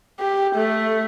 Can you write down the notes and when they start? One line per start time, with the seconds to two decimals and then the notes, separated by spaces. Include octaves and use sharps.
0.20 G4
0.55 A3